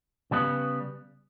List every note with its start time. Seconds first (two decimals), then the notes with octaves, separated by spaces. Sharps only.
0.31 C#3 G3 B3